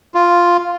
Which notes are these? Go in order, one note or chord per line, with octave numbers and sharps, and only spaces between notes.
F4